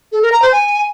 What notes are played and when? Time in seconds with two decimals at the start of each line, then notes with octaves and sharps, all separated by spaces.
0.12 A4
0.22 A#4
0.32 A#5
0.42 C5
0.52 G#5